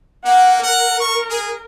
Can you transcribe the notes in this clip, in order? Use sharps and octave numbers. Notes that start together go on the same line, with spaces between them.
A#3 F#5
A#4 F#5
C#6
G#4